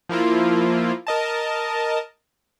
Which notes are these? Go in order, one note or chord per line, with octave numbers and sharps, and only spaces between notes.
F3 A#3 E4 F4
A#4 D#5 A5